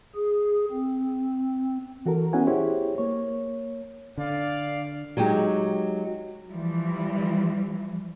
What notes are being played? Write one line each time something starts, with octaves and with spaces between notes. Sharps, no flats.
G#4
C4
E3 F#4 A4 A#4
B3 C#4 E4 F#4 F#5 G#5
E4 G4 G#4 C5 C#5
A#3 C#5
D3 D5 F5
F#3 G#3 D#4 G4
E3 F3 G3